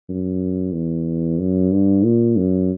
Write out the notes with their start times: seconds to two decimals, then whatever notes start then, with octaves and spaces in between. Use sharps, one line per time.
0.09 F#2
0.74 E2
1.39 F#2
1.72 G2
2.05 A#2
2.37 F#2